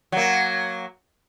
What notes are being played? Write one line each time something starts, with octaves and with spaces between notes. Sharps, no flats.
F#3 A#3